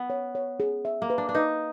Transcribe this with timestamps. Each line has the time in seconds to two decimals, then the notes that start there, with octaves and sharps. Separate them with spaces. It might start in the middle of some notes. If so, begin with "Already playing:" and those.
Already playing: B3
0.10 C#5
0.35 C#5
0.60 G#4
0.85 E5
1.02 A#3
1.10 B4
1.18 D4
1.29 D4
1.35 D#4 B4